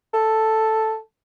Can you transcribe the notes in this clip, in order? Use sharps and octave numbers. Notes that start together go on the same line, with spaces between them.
A4